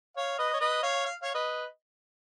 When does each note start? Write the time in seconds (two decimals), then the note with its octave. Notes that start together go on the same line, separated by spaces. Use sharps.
0.17 C#5 F5
0.39 B4 D#5
0.54 C#5
0.60 B4 D#5
0.83 C#5 F5
1.06 F5
1.22 C#5 F5
1.34 B4 D#5